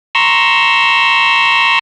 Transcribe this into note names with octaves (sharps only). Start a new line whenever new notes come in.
A#5 C6 C#6 E6